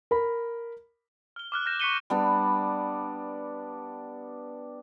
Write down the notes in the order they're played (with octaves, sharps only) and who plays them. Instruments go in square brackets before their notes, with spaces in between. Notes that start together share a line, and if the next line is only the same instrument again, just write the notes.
[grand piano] A#4 B5
[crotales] F6 G7
D6 F6 F#6
F6 G6 A#6 E7
C#6 F#6 B6 C#7 D#7 G7
[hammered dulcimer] G3 B3 D4